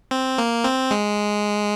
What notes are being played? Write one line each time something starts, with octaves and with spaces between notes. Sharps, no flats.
C4
A#3
C4
G#3